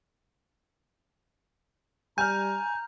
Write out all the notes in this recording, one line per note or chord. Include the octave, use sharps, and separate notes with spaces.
G3 G#5 A#5 F6 G6